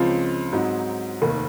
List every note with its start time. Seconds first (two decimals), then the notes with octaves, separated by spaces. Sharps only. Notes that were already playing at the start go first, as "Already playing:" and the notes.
Already playing: C#2 C#3 F3 C4 F4
0.52 G#2 F#3 C4 D#4
1.21 F1 D#2 D#3 A#3